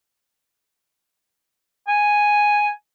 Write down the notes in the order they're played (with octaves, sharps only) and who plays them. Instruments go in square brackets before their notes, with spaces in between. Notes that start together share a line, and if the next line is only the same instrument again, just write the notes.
[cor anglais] G#5